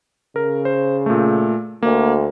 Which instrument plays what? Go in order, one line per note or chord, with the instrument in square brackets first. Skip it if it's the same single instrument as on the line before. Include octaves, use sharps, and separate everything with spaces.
[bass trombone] C#3 [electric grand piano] A#4
[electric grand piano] C5
A#2 A3
[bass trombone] D2 [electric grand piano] A#3